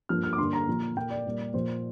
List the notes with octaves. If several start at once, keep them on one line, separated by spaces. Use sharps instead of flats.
G2 F3 A#3 F6
F6
D6
G2 D3 A#3 C6
A#5
A#2 F3 A#3
A#2 A#3 G5
D5
A#2 G3 A#3
A#2 F3 A#3 C5